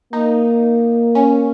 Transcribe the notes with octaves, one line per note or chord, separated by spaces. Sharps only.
A#3 D#4
C#4